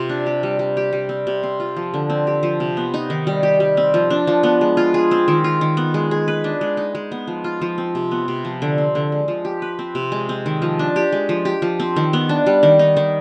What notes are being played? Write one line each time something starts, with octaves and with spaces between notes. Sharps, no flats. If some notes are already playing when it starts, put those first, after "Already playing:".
Already playing: C3 F4
D4
G4
G3
G3
G4
G3
C4
C3
C4
F4
F3
D3
C4
G4
F3
C3
B3
D#4
D#3
G3
G4
G3
C4
F3
D4
F3
B3
G#3
F4
G#4
C4
D#3
F4
D#3
B3
G#3
G#4
B4
D4
G#3
D#4
G#3
B3
F3
F4
F3
C4
C3
B3
C3
F3
D3
C4
D3
G#3
F3
G4
B4
C4
C3
G#3
C4
D#3
F3
D4
G4
G#3
F3
G4
F3
C4
D#3
B3
D4
G3
D#3
D#4
D#3